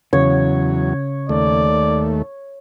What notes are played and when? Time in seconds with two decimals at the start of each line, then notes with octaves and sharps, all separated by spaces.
0.13 E2 C#3 F#3 C#5
1.29 D#2 A3 D5